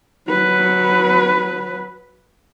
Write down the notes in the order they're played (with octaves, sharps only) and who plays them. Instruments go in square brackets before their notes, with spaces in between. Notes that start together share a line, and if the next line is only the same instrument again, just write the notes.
[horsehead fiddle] F#3 B4